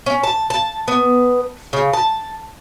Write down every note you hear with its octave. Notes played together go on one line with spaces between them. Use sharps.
C#4
A5
A5
B3
C#3
A5